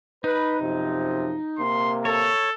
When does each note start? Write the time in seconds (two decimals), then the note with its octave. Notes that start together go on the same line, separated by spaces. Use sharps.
0.24 D#4 B4
0.61 F#2 C3 F3
1.59 C3 A#3 C6
2.05 A4 C#5